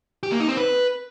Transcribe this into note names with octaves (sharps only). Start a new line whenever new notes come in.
G4
A#3
D#4
C4
B4